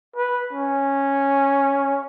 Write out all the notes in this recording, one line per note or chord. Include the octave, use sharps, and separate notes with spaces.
B4
C#4